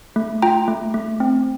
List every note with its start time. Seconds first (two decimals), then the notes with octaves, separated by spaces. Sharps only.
0.16 A3
0.42 F4 G5 A#5
0.68 A3
0.94 A3
1.20 C4